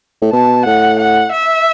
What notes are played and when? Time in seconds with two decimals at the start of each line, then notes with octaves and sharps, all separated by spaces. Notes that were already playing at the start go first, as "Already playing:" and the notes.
0.22 A2
0.33 B2 A5
0.65 A2 F#5
0.99 F#5
1.32 E5